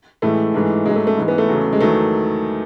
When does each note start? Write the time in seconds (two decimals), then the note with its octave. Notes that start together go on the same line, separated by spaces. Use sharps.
0.22 A2 E3 G#3 A3
0.54 G#2 E3 G#3
0.86 G#2 F#3 G#3
0.96 A3
1.07 A3
1.17 G#2 E3 G#3
1.28 B3
1.38 A3
1.49 E2 C#3 F#3
1.73 G#3
1.80 E2 D#3 F#3 A3